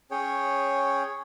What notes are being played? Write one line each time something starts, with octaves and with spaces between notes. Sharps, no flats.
C#4 G#4 C#5 G5